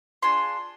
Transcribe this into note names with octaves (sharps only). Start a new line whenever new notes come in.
D4 F4 G#4 C6